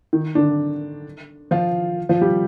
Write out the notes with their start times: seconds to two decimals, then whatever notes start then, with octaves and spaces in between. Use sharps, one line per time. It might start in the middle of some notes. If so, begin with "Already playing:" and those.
0.13 D#3
0.35 D3 D4
1.51 F3 F4
2.09 F3 F4
2.21 G3 G4